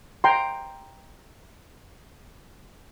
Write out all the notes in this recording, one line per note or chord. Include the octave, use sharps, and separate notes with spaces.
G5 A#5 C6